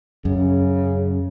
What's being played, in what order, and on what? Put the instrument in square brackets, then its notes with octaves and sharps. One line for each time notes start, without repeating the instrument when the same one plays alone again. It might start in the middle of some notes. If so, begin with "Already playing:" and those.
[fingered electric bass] F#2 [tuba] C#3